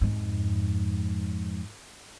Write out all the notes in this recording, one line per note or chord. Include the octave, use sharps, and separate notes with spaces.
F2 G#2